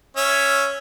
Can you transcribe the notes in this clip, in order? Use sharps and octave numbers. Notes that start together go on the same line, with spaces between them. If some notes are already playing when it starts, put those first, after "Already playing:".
C#4 E5